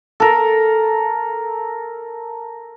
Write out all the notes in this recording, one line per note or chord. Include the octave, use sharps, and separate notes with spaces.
A4 A#4